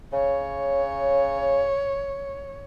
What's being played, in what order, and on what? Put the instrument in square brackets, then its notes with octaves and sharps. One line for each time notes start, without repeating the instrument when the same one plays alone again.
[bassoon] C#3 [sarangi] C#5